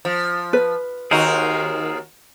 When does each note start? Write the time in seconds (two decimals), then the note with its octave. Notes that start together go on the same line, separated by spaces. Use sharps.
0.05 F3
0.53 B4
1.11 D#2 D#4 F#4 G#4 A#4 C5